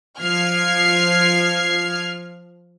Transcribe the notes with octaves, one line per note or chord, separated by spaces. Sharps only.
F3 F6 G#6 C7